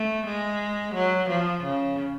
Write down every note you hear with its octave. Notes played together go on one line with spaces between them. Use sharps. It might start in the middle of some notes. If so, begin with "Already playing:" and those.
Already playing: A3
G#3
F#3
F3
C#3